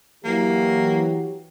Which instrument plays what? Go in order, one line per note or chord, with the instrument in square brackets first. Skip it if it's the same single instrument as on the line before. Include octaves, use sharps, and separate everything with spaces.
[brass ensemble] E3 F#3 [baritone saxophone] A#3 [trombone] G4